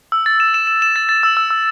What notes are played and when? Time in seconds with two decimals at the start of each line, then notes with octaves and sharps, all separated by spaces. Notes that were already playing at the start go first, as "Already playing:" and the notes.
0.12 E6
0.26 A6
0.40 E7
0.54 E7
0.67 E7
0.82 E7
0.96 A6
1.09 A6
1.23 E6
1.37 E6
1.50 E6